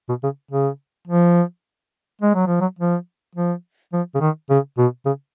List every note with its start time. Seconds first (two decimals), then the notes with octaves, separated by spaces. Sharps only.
0.09 B2
0.24 C#3
0.51 C#3
1.08 F3
2.22 G#3
2.35 F#3
2.47 F3
2.61 F#3
2.79 F3
3.35 F3
3.93 F3
4.15 C#3
4.21 D#3
4.50 C#3
4.78 B2
5.06 C#3